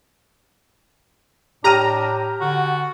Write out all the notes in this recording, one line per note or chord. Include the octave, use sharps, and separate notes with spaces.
A2 D4 G4 A#5 F6 D#7
D3 F#4